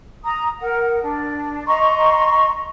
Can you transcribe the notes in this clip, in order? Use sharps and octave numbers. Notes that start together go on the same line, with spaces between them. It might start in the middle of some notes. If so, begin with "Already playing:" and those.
A#5 D#6
A#4 F#5
D4
D#5 A#5 C6 C#6